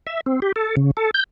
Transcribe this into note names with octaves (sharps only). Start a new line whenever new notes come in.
E5
C4
G4
A4
C#3
A4
G6